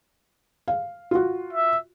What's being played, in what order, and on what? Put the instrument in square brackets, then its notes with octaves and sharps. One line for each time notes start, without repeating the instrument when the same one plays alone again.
[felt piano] F5
F4 F#4
[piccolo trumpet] E5